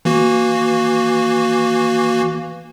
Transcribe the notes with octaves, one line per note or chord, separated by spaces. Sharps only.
E3 A#3 F#4